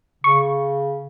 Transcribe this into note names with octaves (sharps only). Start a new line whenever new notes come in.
C#3 C#6